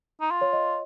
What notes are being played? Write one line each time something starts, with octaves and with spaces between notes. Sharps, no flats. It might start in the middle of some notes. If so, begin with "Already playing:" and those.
D#4
F4
C#5
D#5